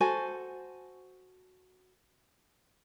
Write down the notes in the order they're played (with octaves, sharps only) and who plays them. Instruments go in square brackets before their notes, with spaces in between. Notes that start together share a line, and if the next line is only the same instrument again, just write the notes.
[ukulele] F#4 A4 C5 G#5